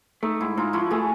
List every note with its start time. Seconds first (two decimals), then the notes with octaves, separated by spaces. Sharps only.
0.23 A3 D#4
0.40 G#2 E4
0.57 G#2 D#4 F4
0.73 F3 E4 F#4
0.91 A3 F#4 G#4